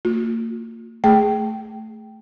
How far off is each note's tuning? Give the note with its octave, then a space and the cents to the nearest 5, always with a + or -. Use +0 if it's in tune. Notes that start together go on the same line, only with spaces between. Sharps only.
A#3 -35 F4 +40
A3 +0 G#4 +0 G5 -5